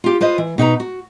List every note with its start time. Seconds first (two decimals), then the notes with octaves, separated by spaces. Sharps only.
0.04 F4 G4
0.21 F4 B4 C5 D#5
0.38 E3
0.58 B2 D#4 B4 A#5
0.80 F#4